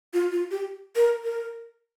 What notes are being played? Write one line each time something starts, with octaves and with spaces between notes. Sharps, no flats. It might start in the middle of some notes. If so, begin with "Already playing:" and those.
F4
F4
G4
A#4
A#4